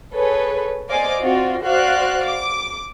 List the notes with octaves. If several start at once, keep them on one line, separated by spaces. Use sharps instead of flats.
G#4 A4 B4 C#5
C5 D5 D#5 F5 G#5 D6
C4 F4 F#4 C5 D5
F#4 C5 D5 F5 F#6
D6